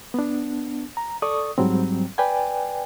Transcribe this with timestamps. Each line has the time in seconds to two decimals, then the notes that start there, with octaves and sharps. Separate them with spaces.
0.14 B3 D4
0.97 A#5
1.22 A4 D5 C#6 D#6
1.58 G#2 F#3 G3 C4
2.18 B4 D5 G5 G#5